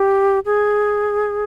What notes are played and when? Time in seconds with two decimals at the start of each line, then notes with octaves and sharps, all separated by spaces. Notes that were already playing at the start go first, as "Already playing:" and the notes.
Already playing: G4
0.45 G#4